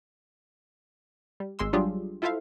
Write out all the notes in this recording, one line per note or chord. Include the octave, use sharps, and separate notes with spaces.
G3
G#1 G#3 C6 E6
F#3 G3 D4 F4 G4 G#4
E4 F4 A4 C5 E5 F5